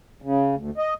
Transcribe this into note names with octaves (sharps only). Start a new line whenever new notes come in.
C#3
D2
D#5